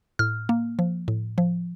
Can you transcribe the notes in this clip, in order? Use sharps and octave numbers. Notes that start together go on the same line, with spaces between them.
A2 F6
A#3
F3
A2
F3